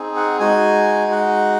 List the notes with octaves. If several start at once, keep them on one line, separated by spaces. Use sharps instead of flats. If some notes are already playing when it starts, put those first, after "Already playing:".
Already playing: C4 D#4 G#4
F#5
G#3 D#4 F#4 G#5
F#5